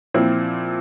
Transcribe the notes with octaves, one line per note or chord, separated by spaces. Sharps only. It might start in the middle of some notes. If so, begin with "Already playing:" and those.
A#2 F3 C4 E4